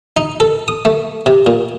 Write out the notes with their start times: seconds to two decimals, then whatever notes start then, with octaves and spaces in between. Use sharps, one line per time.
0.17 D#4
0.40 A4
0.68 D#6
0.85 A3
1.26 C3
1.46 A#2